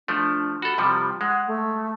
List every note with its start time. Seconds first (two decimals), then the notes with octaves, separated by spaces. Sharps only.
0.08 F3 A3 D4
0.62 F#4 A4 B5
0.78 C3 F3 G3
1.21 G#3 F#5
1.47 A3